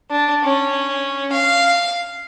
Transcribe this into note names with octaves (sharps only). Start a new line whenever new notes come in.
D4
C#4
F5